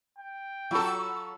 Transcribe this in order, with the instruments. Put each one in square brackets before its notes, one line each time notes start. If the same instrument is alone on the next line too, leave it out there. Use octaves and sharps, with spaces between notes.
[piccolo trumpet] G5
[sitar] F#3 A4 [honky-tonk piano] F4 B5 C#6